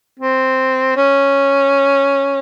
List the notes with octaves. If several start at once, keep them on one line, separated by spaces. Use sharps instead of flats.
C4
C#4